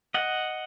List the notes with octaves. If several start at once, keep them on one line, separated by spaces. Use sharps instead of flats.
D#5 F#5